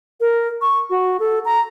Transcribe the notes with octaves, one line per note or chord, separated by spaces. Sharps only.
A#4
C#6
F#4
A4
A#5